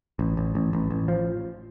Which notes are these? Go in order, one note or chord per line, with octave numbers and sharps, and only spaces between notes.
A1
A1
A1
A1
A1
F3